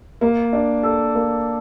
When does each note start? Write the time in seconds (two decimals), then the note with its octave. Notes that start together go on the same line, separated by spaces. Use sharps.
0.21 A#3
0.53 D4
0.83 A4
1.15 A#3